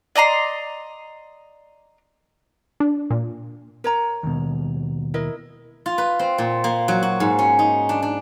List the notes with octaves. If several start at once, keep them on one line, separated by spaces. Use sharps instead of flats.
D5 D#5 A#5 C6
D4
A#2
A#4 C#5 A#5
D#2 B2
E4 A#4 D#5
F4
B4
C4
A#2
A#3
F#3
F#4
G#2
C#4
D#4
D4
D4